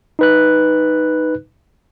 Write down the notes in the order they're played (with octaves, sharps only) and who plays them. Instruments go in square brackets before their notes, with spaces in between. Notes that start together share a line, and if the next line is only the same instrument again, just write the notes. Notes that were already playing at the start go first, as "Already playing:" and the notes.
[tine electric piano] D#4 B4 F#6